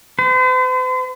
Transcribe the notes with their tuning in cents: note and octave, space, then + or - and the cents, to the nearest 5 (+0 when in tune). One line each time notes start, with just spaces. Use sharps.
C5 -45